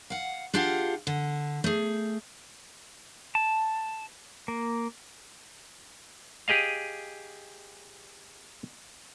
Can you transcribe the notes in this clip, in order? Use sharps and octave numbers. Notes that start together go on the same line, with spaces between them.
F5 F#5
D4 F4 G4 G#4 F5 F#5
D3
A3 G#4
A5
A#3
G4 G#4 D#5 F5